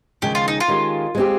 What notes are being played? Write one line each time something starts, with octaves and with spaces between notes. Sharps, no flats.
D#2 C#3 F3 G#3 G4
F4
D#4
F4
D#3 G#3 C#4 G4
G#3 C4 G4